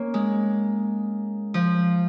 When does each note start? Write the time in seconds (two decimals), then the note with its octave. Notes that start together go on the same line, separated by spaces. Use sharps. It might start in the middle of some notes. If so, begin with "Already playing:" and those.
Already playing: A#3 C#4
0.14 G#3
1.54 F3